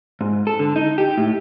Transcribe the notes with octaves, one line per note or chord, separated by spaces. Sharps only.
G#2
A4
D3
D#4
G4
A2